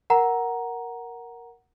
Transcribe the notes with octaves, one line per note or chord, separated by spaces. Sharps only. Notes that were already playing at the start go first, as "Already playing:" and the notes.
A#4 F#5 A#5